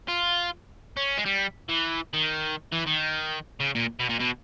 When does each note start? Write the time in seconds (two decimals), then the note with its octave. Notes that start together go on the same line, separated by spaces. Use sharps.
0.08 F4
0.97 C#4
1.17 G#3
1.26 G3
1.69 E3
2.13 D#3
2.73 E3
2.87 D#3
3.60 C#3
3.75 A#2
4.00 B2
4.09 A#2
4.20 B2